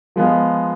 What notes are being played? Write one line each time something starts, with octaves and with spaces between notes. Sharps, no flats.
F3 G#3 B3 F4